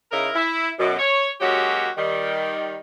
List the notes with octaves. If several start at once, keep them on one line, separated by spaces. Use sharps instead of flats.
C#3 D#4 E4 A#4
E4
F#2 B2
C#5
F#3 G#3 A#3 C#4 F#4 G4
D#3 G3